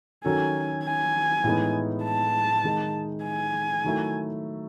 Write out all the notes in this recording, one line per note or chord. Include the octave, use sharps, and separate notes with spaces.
D#3 F#3 C#4 F#4 A4 G#5
G#5
A2 E3 G#3 B3 D#4
A5
D#3 G#3 D#4
G#5
D#3 F#3 A3 E4